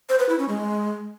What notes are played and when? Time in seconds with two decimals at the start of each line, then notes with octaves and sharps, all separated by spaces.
0.09 C5
0.19 B4
0.29 E4
0.39 C#4
0.48 G#3